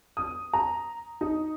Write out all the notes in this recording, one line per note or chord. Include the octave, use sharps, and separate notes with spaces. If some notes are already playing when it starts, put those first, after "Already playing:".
D#6
A#5
D#4